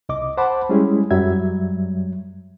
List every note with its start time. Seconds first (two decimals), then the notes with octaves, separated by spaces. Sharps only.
0.09 C2 D#5 D6
0.37 C5 F#5 A5 B5 D6
0.69 G3 G#3 C#4 E4 G#4
1.11 F#2 F#3 G3 E5 G#6